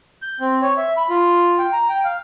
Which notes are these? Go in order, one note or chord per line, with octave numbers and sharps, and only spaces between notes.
G6
C4
C#5
E5
B5
F4
G5
A#5
G5
F5